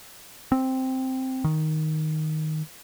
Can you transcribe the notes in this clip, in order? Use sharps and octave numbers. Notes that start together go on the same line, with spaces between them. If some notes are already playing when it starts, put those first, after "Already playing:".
C4
D#3